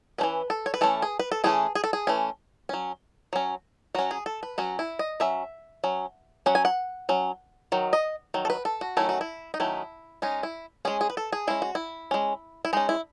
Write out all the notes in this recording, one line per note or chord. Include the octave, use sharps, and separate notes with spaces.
E3 A3 C#4 B4
A4
C#5
B4
E3 A3 C#4 A4
G#4
B4
A4
E3 A3 C#4 G#4
G#4
A4
G#4
E3 A3 C#4
F#3 C#4
F#3 C#4
F#3 C#4 F#4
G#4
A4
B4
F#3 C#4 F#4
E4
D#5
F#3 C#4 E5
F#3 C#4
F#3 C#4 F#5
G#5
F#5
F#3 C#4
D#3 F#3
D#5
D#3 F#3
A4
B4
A4
F#4
D#3 F#3 A3 C#4 E4
F#4
E4
D#4
D#3 F#3 A3 C#4 E4
G#3 C#4 D#4
E4
G#3 C#4 G#4
G#4
B4
A4
G#4
G#3 C#4 E4
F#4
E4
G#3 C#4
E4
G#3 C#4 D#4
E4